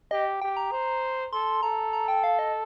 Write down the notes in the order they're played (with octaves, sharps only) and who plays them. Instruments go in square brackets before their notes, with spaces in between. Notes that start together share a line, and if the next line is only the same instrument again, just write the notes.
[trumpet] G4 [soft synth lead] D#5
[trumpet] G4 [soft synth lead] G5
[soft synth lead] A#5
[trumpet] C5
[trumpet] A4 [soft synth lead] C6
[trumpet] A4 [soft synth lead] A#5
[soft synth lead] A#5
G5
F5
D#5